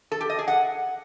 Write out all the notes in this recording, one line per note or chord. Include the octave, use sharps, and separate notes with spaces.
A4
G4
D#5
G#4
F#5